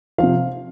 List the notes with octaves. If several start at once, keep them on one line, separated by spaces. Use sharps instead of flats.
C3 F3 F5